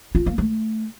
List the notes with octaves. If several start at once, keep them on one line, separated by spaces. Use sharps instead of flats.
F4
A#3
A3